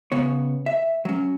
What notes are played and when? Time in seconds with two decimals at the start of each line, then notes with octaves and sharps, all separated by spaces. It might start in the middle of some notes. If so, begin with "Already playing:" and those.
0.12 C#3 B3 C#5
0.66 E5
1.05 F#3 C#4